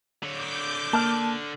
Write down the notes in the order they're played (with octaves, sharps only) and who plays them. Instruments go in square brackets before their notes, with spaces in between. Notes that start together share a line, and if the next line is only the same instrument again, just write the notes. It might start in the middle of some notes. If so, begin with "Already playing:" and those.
[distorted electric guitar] D3 C#5 [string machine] D6 G6
[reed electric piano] A#3 [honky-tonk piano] A5 F6